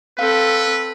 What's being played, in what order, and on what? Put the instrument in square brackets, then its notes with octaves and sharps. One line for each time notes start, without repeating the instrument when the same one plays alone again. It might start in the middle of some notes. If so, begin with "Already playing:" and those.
[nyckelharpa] C4 A4 [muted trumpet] B4 [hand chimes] F5